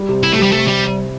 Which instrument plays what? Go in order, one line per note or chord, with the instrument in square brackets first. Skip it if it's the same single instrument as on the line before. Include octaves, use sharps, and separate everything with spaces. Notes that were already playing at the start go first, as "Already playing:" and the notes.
Already playing: [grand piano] G3
C3
[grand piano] C3 [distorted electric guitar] E4
[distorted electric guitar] A3
[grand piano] C3 [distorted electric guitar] G3
[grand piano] C3 [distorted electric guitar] A3
[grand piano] C3 [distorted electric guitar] G3